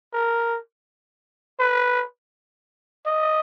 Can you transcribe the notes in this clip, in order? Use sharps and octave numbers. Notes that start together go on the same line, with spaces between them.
A#4
B4
D#5